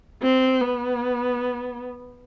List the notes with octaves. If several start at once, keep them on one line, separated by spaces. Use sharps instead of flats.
C4
B3